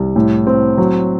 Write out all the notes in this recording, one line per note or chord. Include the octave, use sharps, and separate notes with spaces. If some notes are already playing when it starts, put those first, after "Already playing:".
Already playing: C2
A2
C4
F#3